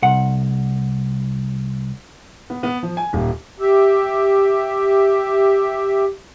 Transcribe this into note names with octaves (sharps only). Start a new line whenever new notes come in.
C2 F#5
B3
B3
F3
G#5
D#1
G4 E5